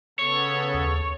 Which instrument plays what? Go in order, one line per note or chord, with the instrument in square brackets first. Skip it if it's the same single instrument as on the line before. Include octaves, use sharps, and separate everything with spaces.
[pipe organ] C#3 B3 A4 [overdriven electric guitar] C#5
[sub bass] D#2